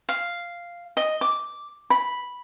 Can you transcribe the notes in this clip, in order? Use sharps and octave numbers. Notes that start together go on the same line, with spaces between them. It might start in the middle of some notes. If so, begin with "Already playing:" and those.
F5
D#5
D6
B5